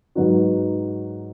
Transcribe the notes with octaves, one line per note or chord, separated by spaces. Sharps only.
G#2 F#3 D#4 F#4 B4